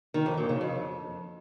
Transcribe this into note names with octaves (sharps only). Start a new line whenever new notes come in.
D#3
F2
A#2
C#3
F2